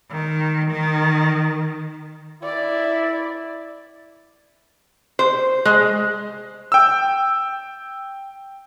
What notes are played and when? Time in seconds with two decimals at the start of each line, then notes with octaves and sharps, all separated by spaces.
0.10 D#3
0.70 D#3
2.43 E4 D5
5.19 C5
5.65 G#3
6.72 G5 E6